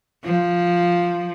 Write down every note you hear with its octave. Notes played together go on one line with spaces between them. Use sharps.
F3